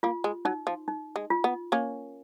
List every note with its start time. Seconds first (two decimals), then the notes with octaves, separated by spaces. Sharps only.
0.03 A#3 F4
0.24 G#3
0.45 F#3 D#4
0.67 F3
0.88 D#4
1.16 G#3
1.30 F4
1.44 B3
1.72 A#3 C#4